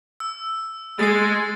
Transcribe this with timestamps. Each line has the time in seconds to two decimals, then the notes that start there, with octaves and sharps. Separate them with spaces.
0.20 E6
0.99 G#3 A6 C7